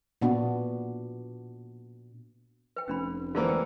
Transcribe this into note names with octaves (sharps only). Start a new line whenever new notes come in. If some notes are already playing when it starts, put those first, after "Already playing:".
A#2 B3 D4 F#4
B4 G5
F1 C#4 D4 B5
D3 E3 A#3 F4 C5
G5